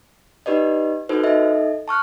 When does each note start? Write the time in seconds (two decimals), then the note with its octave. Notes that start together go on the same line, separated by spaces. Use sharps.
0.46 D#4 G4 B4 D5 D#5
1.09 D#4 F#4 A4 B4 C5
1.23 D#4 A4 D#5 E5
1.88 A5 C#6 F6 F#6